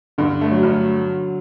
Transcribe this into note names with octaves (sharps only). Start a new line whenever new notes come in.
G2 D3
A3
F#3
G2